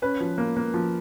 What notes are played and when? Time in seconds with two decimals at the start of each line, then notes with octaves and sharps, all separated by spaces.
0.02 C#4 B4
0.20 F3
0.38 A#3
0.57 A#3
0.74 F3